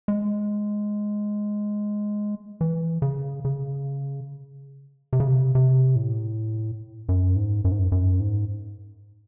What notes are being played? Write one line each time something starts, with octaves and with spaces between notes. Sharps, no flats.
G#3
E3
C#3
C#3
C3
C#3
C3
C3
A2
F#2
G#2
F#2
G#2
F#2
F#2
G#2